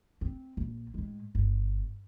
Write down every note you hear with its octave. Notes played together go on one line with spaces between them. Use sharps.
C4
A#1
A2 G#3
G1